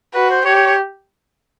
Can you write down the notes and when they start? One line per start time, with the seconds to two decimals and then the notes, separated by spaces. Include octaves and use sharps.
0.14 F#4 B4
0.30 C5
0.45 G4 C#5
0.55 C#5
0.66 C#5